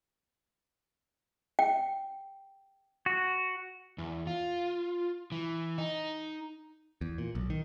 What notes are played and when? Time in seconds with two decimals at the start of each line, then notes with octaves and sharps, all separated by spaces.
1.59 G5
3.06 F#4
3.98 E2
4.27 F4
5.32 E3
5.78 D#4
7.01 E2
7.18 A#2
7.35 B1
7.50 D#3